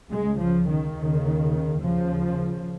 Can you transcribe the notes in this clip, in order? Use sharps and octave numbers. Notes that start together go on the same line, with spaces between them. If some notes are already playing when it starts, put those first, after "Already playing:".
C#2 C#3 G#3
F3
D#3
D#2 C#3
D#2 C#3 F3